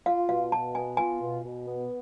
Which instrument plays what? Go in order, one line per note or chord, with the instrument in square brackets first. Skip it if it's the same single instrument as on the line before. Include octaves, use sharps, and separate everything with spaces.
[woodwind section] F4 [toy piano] F5
[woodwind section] B2 [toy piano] F5
[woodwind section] B2 [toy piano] A5
[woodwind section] B3 [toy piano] G#5
[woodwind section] F4 [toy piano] G#5
[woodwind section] B2
B2
B3